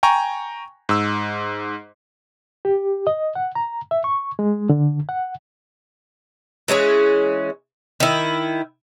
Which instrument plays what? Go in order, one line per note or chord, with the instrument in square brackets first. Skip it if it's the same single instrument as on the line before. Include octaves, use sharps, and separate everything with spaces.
[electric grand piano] G5 G#5 A#5 C#6
G#2 E6
[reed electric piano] G4
D#5
F#5
A#5
E5
C#6
G#3
D3
F#5
[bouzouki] E3 G#3 C#4 G#4
D#3 E4